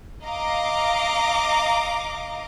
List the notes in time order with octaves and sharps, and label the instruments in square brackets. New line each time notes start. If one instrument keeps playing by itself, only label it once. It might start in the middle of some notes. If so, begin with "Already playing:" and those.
[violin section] D#5 F5 A#5 D6